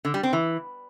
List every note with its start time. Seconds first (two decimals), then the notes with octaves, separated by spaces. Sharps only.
0.05 D3
0.14 G3
0.23 C4
0.33 E3